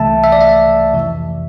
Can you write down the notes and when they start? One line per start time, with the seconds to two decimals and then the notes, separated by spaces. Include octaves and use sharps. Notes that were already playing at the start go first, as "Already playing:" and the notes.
Already playing: C2 C3 E3 A3 E5 A5
0.24 E5
0.32 D5
0.41 E5
0.93 F2 C3 E3